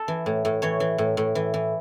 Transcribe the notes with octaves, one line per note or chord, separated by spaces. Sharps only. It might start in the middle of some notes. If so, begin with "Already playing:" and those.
Already playing: A4
E3
A2
A2
E3 C#5
E3
A2
A2
E3
E3